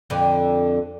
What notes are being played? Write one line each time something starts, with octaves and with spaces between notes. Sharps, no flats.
F2 D3